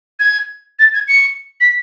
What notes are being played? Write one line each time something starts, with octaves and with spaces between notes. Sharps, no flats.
G#6
A6
G#6
C#7
B6